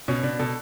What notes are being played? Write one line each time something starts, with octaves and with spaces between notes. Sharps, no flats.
B2 C#4
B2 D4
B2 A4